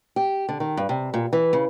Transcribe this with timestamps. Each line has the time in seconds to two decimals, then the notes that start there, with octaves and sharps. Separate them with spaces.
0.16 G4
0.49 D3
0.60 D#3
0.77 G2
0.89 C3
1.14 A#2
1.33 E3
1.53 C#3